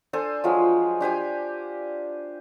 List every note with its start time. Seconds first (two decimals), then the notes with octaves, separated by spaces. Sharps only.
0.13 D4 A4 C5 G#5
0.44 F3 F#3 G#3 F4
1.00 D4 G4 C5 G#5